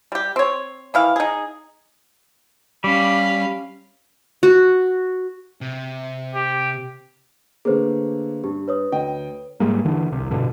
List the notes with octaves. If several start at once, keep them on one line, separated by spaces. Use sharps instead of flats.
G3 G4
C4 C#5
D#3 E3 F5
D#4 G#4
G3 C#4 F5 B5
F#4
C3
G4
D3 A3 A#3 G#4 B4 C5
G2 G4
B4 C#5 D#6
D2 D#5 G5
G#2 G3 G#3 A#3
E2 D3 E3
D#1 C2 C3
A1 G2 B2 D3